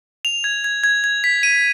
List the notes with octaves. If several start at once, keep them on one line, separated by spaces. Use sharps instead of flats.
F7
G#6
G#6
G#6
G#6
B6
D#7